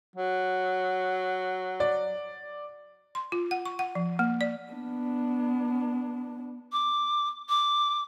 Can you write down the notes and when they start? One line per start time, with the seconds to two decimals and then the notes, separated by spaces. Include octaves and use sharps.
0.16 F#3
1.80 D5
3.15 C6
3.32 F4
3.51 F#5
3.66 C#6
3.79 F#5
3.95 F3
4.19 A#3
4.41 D5
4.72 B3 D4
6.72 D6
7.49 D6